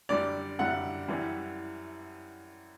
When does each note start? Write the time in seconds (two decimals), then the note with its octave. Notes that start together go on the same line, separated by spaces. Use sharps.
0.09 F#2 D3 G3 D5
0.59 F#2 D3 G3 F#5
1.08 F#2 E3 G3